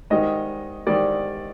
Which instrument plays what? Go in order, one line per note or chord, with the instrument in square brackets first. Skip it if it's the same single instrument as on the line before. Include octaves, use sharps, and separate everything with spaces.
[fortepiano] G#2 D#3 G3 [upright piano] D#5
[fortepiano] G#2 D#3 G3 [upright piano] D5